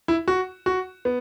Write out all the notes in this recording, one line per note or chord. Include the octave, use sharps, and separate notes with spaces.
E4
F#4
F#4
B3